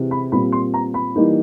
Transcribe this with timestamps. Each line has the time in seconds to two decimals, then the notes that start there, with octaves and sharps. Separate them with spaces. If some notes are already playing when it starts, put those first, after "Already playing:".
Already playing: C3 E3 G#3
0.11 B5
0.32 A#2 G3 C4 B5
0.52 C6
0.74 A#5
0.94 B5
1.16 E3 G3 A#3 D#4